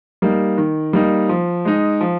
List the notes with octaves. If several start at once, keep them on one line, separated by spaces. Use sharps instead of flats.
G3 A#3 D#4
D#3
G3 A#3 D#4
F3
G#3 D#4
F3